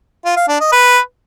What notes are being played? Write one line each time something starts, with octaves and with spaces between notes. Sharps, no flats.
F4
F5
D4
D#5
B4